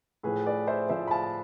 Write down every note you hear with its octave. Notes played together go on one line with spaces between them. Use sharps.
A2 F3 G#4 B4
B4 D5
C5 E5
A2 F3 C5 E5
B5
F5 A5